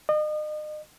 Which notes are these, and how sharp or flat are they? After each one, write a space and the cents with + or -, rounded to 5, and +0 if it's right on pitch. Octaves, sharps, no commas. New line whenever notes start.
D#5 -35